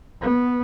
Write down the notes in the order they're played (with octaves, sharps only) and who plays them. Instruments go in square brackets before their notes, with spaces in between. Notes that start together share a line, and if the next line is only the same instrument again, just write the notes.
[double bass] B3